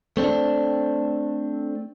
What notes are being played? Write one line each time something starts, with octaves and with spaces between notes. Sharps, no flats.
A3 C4 D4